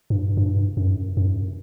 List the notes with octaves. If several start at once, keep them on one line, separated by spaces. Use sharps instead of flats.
G2
G2
F#2
F#2